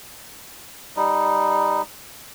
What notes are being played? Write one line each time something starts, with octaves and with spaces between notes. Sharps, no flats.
G3 D#4